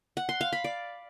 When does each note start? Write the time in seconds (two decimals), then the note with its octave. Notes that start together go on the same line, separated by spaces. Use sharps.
0.17 F#5
0.29 C6
0.41 F5
0.53 B5
0.64 D5